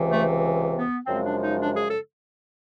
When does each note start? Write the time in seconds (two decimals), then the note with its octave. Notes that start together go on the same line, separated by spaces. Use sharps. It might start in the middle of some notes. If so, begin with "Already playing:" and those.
Already playing: C#2 C3 E3
0.11 A3
0.78 B3
1.05 F#2 C#3 F3 G#3 C4
1.25 D4
1.43 D#4
1.62 D4
1.77 G#4
1.91 A4